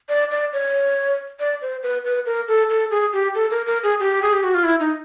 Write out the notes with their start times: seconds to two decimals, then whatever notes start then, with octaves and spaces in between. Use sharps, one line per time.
0.09 D5
0.31 D5
0.53 C#5
1.40 D5
1.62 C5
1.83 B4
2.05 B4
2.26 A#4
2.48 A4
2.70 A4
2.91 G#4
3.13 G4
3.35 A4
3.51 A#4
3.67 A#4
3.83 G#4
4.00 G4
4.22 G#4
4.33 G4
4.44 F#4
4.54 F4
4.64 E4
4.80 D#4